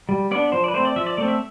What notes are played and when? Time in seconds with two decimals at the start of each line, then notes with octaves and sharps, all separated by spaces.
0.09 G3
0.31 B3 D4 D5
0.52 F3 C5
0.64 B4 D5
0.74 A3 C4 C5
0.85 D5
0.96 F3 E5
1.06 D5
1.17 A3 C4 D5
1.28 E5